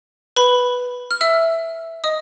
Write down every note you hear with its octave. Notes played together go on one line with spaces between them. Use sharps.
B4 B5
F6
E5 E6
D#5 D#6